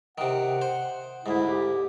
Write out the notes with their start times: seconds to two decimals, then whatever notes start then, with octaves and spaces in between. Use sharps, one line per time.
0.18 C3 D#3 F#5
0.62 C5
1.26 D2 G#2 E4
1.49 G4